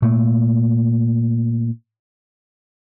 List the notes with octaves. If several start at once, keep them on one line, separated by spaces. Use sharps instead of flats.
A#2 A3